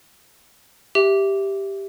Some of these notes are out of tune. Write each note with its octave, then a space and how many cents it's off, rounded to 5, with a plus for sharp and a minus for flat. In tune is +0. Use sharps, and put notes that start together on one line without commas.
G4 +0 E5 +0